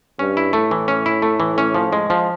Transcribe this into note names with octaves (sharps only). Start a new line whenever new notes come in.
G2 C#4
E4
A2 A3
E3
C#4
E4
A3
E3
C#4
F3
G#3
F3